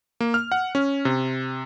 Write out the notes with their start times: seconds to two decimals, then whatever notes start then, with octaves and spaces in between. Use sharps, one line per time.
0.20 A#3
0.34 F6
0.52 F#5
0.75 C#4
1.05 C3